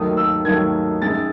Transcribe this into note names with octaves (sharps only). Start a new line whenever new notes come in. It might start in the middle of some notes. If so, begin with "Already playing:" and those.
Already playing: D#2 D#3 F#3 A3 D#6
E6
D#2 D#3 F#3 A3 G#6
F#2 D#3 G#3 A6